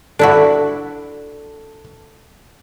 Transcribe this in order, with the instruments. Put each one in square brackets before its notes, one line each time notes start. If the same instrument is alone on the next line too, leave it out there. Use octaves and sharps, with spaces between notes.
[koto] D4 E4 F#4 [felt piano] A4